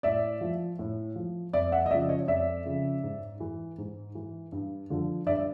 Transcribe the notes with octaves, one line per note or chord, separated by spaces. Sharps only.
A2 D5 E5
F3
A2
F3
F2 D5 E5
E5 F#5
D#5
C#3 F3 D5 E5
C#5 D#5
F2 D5 E5
C#3 F3
G#2
E3
G#2
E3
G2
D3 F3
G2 D5 E5